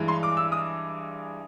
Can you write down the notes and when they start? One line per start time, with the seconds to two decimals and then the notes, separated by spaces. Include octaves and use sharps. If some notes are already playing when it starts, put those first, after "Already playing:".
Already playing: G2 E3 G#3
0.08 C6
0.23 D6
0.37 E6
0.52 D#6